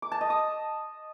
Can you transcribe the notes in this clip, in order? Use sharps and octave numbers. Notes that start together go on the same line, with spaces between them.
D6
A5
D#5
D#6